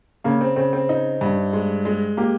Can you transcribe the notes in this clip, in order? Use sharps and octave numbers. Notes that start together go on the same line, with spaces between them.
C#3 A#3
C4
C#3 C4
C4
D#4
G2
G#3
G#3
A#3 G4